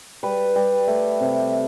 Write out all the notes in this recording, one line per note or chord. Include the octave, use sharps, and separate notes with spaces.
G3 B4
G3
A3
C3